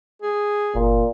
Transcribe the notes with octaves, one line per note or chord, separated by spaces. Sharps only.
G#4
G1 A#2